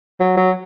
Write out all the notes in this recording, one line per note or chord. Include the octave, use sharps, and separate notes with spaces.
F#3
F#3